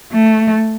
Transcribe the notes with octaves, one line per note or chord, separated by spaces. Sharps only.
A3